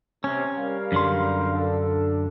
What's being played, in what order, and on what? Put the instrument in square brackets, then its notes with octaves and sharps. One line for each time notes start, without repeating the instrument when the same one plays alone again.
[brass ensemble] C3 [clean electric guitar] C#4
[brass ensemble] G3 A#4 F5
[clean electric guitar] F#2 D3 C6
[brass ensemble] D4 A4